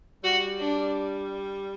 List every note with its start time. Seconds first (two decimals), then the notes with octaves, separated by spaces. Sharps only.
0.23 G3 F#4
0.59 D4